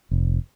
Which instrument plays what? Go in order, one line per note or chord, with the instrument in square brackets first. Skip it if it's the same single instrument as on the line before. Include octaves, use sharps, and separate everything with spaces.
[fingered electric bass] F1